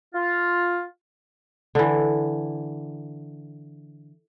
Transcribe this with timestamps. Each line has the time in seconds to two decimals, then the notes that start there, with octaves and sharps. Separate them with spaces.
0.15 F4
1.75 D3 E3